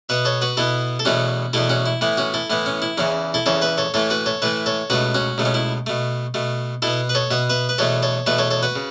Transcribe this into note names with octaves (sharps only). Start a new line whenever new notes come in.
B2 B3 B4 E5
A4 C#5
F#4 B4
B2 B3 E4 A4
A4
E2 B2 A3 C#4 F#4
E2 B2 A3 E4 A4
C#4 F#4
E4
A2 E3 B3 E4
C#4 F#4
E4 A4
A2 E3 B3 E4
C#4
E4
E2 C#3 E3 C#4
E4 A4
E2 C#3 E3 A4 C#5
B4 E5
A4 C#5
A2 E3 A3 A4 C#5
F#4 B4
A4 C#5
A2 E3 A3 B4 E5
A4 C#5
C#2 B2 A3 F#4 B4
C#4 F#4
C#2 B2 A3
C#4
E4
B2 A3
B2 A3
B2 B3 E4 A4
B4
A4 C#5
B2 B3 E5
B4 E5
B4
E2 B2 A3 A4 C#5
A4 C#5
E2 B2 A3 B4 E5
A4 C#5
A4 C#5
F#4 B4
C#3